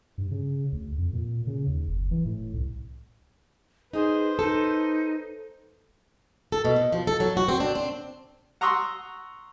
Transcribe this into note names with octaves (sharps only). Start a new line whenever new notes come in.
G2
C#3
D2
F2
A#2
C#3
D#2
F#1
E3
A2
C2
D#4 G#4 B4 C5
D#4 A4
A4
B2
B2
F3
A4
F#3
F#4
C4
D4
C4
F#5 A#5 C6 C#6 D#6 E6